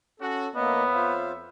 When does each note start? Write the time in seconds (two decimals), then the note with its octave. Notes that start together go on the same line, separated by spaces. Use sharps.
0.20 C#4 F#4 A4
0.55 F2 A#3 B3 C#5 D#5 E5
0.93 F4 C5 F5